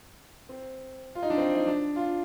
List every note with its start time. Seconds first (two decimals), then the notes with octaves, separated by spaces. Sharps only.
0.49 C4
1.15 F4
1.23 D#4
1.30 D4
1.38 C4
1.55 D#4
1.67 D4
1.96 F4